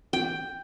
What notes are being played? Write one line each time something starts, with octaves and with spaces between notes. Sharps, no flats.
G5